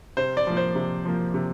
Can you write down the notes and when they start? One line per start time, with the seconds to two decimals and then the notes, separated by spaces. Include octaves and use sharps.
0.17 C3 C5
0.37 D5
0.47 F3 A#3
0.57 C5
0.75 C3
1.05 F3 A#3
1.34 C3